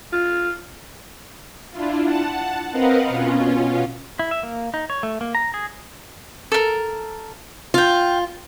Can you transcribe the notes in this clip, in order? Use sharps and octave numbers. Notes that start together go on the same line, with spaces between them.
F4
D4 E4 F4
F#5 A5
C4 A#4 B4 D#5 F5 F#5
B2 C#4 F4
E4
E5
A#3
D#4
C#5
A3
A#3
A#5
G#4
A4 A#4
F4 F5 G5